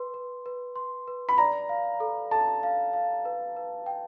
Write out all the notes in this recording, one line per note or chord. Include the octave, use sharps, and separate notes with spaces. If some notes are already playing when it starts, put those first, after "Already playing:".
Already playing: B4 C6
B4
B4
C6
B4
B5
D5 A#5
F5
A4
A4 A5
F5
F5
B4
B4
G5